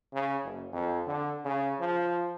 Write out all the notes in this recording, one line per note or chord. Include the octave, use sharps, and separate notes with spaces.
C#3
F#1
F2
D3
C#3
F3